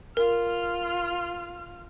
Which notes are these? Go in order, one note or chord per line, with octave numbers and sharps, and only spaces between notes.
F4 A#4 F6